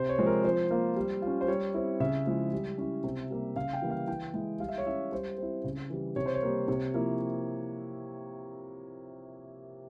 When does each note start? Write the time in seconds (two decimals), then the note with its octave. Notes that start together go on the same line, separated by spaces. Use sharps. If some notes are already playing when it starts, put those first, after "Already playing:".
Already playing: C3 C5
0.09 C#5
0.18 F3 G#3 C4
0.27 A#4
0.44 F3 C5
0.71 A#3 F4
0.96 G3
1.22 F4
1.27 C#4
1.41 C5
1.48 G3 C#5
1.74 C4 E4
2.00 C#3 E5
2.26 F3 G#3 E4
2.53 G3
2.78 C#4 E4
3.04 C3
3.31 G3 A#3
3.56 C#3 F5
3.73 G5
3.82 E3 G3 A#3 E4
3.90 F5
4.08 E3 G5
4.34 G#3 E4
4.60 G3 F5
4.69 E5
4.78 C#5
4.86 C#4 E4 E5
5.12 G3 C5
5.38 C4 E4
5.64 C#3
5.90 E3 G3
6.16 C3 C#5
6.26 C5
6.35 C#5
6.42 G3 A#3
6.68 C3
6.93 F3 A#3 E4